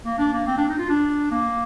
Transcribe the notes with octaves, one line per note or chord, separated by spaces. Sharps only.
A#3
D4
A#3
C4
D4
D#4
F4
D4
A#3